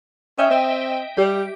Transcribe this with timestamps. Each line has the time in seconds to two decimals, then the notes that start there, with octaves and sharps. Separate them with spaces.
0.38 C#4 D#5 E5 G5
0.50 C4
1.17 G3 G4